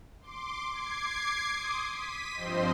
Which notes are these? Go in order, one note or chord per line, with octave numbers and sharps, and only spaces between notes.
C6 D6
D6 G#6 C7
C6 D6 D#6
B6 D#7
G2 F3 C4 C5 D#5 C6